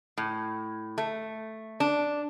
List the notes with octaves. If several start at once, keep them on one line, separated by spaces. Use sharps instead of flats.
A2
A3
D4